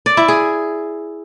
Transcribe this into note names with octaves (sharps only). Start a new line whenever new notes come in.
D5
E4
G#4